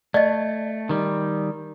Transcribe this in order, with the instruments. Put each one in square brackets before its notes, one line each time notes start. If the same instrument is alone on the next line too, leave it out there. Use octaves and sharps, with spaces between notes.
[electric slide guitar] A3 [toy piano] D5 D#5
[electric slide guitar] D#3 G3